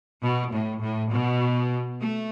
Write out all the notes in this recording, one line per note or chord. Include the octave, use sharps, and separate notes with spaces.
B2
A2
A2
B2
A3